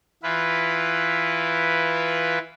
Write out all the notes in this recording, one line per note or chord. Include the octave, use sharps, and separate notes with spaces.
E3 E4 F4 B4